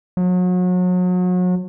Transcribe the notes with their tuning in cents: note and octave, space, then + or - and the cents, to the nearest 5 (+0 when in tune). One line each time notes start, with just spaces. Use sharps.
F#3 -35